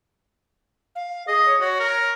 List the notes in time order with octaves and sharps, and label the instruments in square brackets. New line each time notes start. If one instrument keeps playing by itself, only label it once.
[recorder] F5
[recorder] G#4 [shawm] D#5
[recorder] C#5
[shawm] F#4 [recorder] C#5
[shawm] A#4